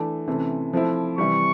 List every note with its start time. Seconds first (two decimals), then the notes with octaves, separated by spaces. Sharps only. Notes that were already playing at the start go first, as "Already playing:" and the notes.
Already playing: E3 A3 D4
0.28 C3 E3 A3 C#4
0.73 F3 A3 C4 E4
1.18 C3 E3 G3 C#6